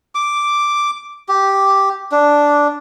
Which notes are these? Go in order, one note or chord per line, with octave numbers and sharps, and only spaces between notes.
D6
G4
D4